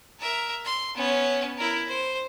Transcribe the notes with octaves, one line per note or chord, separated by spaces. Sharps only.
A#4 E5
C6
B3 C#4
E4 A#4
C5